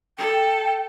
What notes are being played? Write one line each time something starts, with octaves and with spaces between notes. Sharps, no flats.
A4 G5